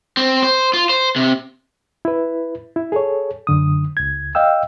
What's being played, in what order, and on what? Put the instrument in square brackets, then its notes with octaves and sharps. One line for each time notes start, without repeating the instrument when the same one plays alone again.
[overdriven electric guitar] C4
C5
F4
C5
C3
[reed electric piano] E4 B4
E4
G#4 A4 C#5
F#2 D3 D#6
C#2 G#6
D#5 F5 G5 E6